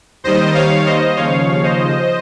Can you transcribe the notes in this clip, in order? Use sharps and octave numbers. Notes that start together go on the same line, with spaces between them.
D#2 D#3 G3 C5 D#5
C#5 F5
C5 D#5
D#2 C#3 F3 C#5 F5
C5 D#5